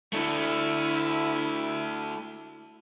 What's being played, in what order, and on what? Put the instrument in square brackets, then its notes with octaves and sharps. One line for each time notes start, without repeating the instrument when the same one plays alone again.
[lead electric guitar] A3 D4 [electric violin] E4